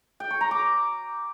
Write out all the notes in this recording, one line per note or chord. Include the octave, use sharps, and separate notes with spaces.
G5
C#6
A#5
D6